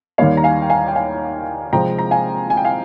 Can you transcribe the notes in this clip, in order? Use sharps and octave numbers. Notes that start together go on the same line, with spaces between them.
D#2 D#3 G3 A#3 C#5 F5
A#5
F5 G#5
G5
F5 G#5
G5
F5 G#5
C3 F3 G#3 C4 G5 A#5
A#5
F5 G#5
G#5
G5
F5 G#5